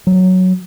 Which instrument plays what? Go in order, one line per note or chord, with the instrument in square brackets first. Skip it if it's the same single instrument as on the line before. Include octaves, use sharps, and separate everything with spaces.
[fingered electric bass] F#3